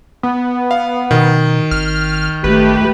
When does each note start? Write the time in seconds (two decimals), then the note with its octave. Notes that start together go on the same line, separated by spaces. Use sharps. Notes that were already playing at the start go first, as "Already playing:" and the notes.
0.23 B3
0.71 F5
1.11 B2 D#3
1.71 G#1 F6
2.44 G#1 A3 G4 B4